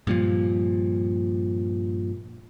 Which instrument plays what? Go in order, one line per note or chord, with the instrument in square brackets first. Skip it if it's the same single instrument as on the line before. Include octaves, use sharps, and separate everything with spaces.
[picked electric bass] G2 A#2 F3